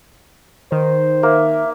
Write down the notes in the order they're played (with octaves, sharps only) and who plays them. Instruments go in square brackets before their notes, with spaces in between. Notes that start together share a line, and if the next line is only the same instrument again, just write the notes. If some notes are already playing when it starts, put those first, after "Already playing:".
[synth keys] D#3 [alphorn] C5
[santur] A#3 [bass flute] E5